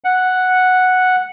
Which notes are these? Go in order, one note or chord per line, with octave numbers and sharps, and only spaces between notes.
F#5